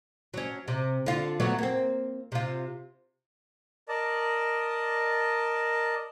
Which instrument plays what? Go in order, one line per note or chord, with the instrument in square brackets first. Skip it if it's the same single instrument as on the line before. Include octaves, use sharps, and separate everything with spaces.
[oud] F#3 C#4
C3
D3 F4
F#3 A3 B3
A#3 C4
C3 F4
[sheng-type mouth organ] A#4 D5 D#5 A5